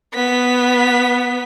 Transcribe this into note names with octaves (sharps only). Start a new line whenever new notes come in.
B3 B6